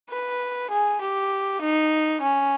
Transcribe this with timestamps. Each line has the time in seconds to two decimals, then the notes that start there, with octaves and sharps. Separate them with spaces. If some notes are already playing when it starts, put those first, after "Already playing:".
0.10 B4
0.70 G#4
1.01 G4
1.61 D#4
2.21 C#4